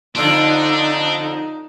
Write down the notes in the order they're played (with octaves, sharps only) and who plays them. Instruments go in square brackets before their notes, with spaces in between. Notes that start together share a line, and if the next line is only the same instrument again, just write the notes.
[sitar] F2 D3 F4 [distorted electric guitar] D4 [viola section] D#4